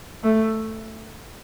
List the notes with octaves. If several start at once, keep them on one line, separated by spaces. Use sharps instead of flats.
A3